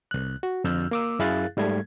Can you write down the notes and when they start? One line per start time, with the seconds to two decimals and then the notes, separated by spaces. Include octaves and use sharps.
0.11 C2 F#6
0.43 F#4
0.64 F2 D3 E6 F6 G6
0.91 A#3 D6 E6
1.19 F#2 E4 G#4 F5 F#6 A6
1.57 G#2 G3 A3 G#6